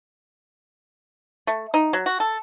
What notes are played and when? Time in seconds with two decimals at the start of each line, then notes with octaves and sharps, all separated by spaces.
1.47 A3
1.74 D#4
1.93 F#3
2.06 F#4
2.20 A4